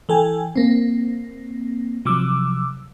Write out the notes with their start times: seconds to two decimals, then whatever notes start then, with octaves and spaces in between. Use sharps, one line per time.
0.09 E3 A4 G5 G#5
0.56 A#3 C4
2.05 C3 F3 F#3 D6 E6